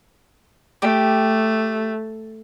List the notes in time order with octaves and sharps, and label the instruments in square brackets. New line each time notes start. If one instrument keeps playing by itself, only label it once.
[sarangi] A3 [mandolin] G4